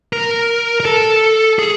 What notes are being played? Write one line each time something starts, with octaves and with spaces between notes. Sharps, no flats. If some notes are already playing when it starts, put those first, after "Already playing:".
A#4
A#4
A4
G#4